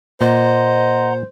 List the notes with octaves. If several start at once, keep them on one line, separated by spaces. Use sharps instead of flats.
A#2 C5 D#5 F#5 A#5 C6